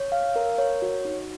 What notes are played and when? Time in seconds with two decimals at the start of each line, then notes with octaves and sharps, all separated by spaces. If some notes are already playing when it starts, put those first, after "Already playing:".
Already playing: C#5
0.12 F5
0.36 A#4
0.58 C#5
0.82 F#4
1.05 D#4